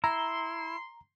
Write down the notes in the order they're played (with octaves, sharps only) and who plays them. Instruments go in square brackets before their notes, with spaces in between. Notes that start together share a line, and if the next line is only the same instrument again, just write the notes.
[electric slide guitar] E4 [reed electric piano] A#5 [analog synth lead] C6